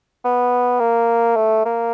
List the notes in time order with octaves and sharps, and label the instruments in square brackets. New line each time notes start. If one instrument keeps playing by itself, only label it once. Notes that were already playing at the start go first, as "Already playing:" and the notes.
[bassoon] B3
A#3
A3
A#3